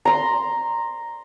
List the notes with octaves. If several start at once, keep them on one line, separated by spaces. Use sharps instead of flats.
A#5 C6